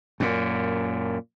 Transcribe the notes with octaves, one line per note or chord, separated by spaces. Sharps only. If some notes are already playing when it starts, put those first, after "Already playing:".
F#2 A#2